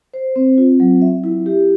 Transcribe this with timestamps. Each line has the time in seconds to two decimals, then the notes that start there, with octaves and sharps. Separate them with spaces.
0.13 C5
0.36 C4
0.58 F4
0.80 F#3
1.02 E5
1.24 E4
1.46 G4